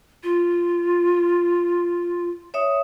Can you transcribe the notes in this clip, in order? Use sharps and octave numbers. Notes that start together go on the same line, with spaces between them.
F4
C#5 E5 D#6